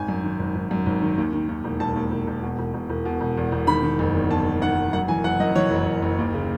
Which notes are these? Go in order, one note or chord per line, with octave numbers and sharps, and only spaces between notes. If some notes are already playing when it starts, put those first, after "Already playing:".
Already playing: G#1 G#5
F#2
D#3
G#1
G#1
F#2
G#1
D#3
D#2
D#3
D#2
E1
E1 A5
D#2
E1
E1
B2
E1
E1
E1
B2
E1
E2
E1
D#3 B5
D#3
F#1
E2
E2 A5
D#3
D#3 F#5
F#1
F#2 F#5
E3 G#5
F#1 F#5
F#2 D#5
E3 C#5
F#1
F#1
F#1
D#2
C#3